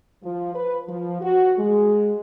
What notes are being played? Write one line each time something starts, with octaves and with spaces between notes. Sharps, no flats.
F3
B4
F3
F#4
G#3